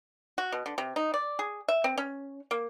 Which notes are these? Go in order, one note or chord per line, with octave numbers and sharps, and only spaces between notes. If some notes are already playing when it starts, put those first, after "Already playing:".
F#4
B2
D3
C3
D#4
D5
G#4
E5
C4
C#4
A#3